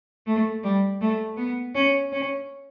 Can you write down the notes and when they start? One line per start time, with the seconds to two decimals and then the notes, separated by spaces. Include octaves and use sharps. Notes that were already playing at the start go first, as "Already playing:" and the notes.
0.27 A3
0.64 G3
1.01 A3
1.37 B3
1.75 C#4
2.12 C#4